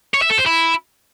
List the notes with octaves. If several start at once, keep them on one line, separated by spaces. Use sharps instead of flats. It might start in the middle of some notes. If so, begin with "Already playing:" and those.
C#5
E5
A4
C5
E4